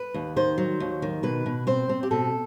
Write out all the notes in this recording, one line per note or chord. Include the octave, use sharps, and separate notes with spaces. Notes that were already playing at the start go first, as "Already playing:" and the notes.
Already playing: B4
D#2
D#3 C5
F#3
D#2
D#3
B2 B4
B2
C4 C5
C4
G4
B2 A4